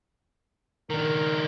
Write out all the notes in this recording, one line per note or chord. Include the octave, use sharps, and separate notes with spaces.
D#3 D4 A#4